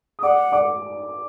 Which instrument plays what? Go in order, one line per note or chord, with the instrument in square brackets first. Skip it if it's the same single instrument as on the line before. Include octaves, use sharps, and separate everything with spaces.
[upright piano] D#6
[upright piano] D5 D6 [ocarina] F#5
[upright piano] D5 D6